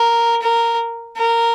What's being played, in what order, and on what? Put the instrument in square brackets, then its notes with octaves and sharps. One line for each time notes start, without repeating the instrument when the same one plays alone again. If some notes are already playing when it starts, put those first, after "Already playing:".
Already playing: [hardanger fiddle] A#4
A#4
A#4